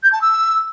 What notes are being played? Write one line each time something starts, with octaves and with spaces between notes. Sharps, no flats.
G6
A5
E6